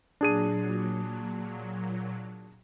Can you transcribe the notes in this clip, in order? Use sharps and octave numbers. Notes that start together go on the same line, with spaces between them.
A#2 F#3 D4 G#4 D#7